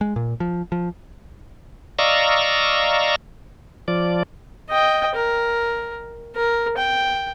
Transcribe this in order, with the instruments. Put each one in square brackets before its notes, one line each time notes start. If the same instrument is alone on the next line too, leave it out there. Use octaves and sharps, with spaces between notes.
[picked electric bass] G#3
A#2
F3
F3
[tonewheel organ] D5 D#5 F5 A#5 C#6 E6
F3 D5
[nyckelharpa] D#5 G5
A#4
A#4
G5